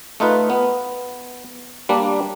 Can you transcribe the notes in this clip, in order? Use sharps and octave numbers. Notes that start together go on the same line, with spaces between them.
A3 D#4 F4 B4
B3
G3 A#3 D4